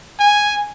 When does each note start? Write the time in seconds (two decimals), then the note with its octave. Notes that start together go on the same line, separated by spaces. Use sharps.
0.19 G#5